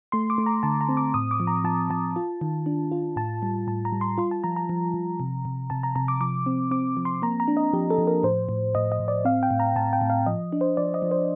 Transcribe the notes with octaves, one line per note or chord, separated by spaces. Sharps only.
A3 C6
D6
A3
A#5
D3 A5
A#5
C4
D6
A2 D#6
D6
F3
A#5
F3 A5
F3 A5
F4
D#3
D4
F4
A2 A5
G3
A2 A5
A#5
G3
C6
F4 C6
A5
F3 A#5
A#5
F3
F3
C3
C3
C3 A5
A#5
C3 A#5
D6
F3 D6
C4
C4 D6
F3
C6
A#3 A#5
A#5
D4
D#5
F3 G4
A4
F3
A#4
A2 C5
A2
A2 D#5
D#5
A2
D5
C4 F5
G5
A2
A#5
A2 A5
G5
A2
F5
F3 D#5
D4
C5
F3 D5
D#5
F3
C5